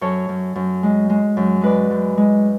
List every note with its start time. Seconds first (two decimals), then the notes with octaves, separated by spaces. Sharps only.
0.01 F#2 A4 C#5
0.29 F#2
0.56 F#2
0.83 G#3
1.10 G#3
1.37 F#2
1.61 G#3 B4 D5
1.90 F#2
2.17 G#3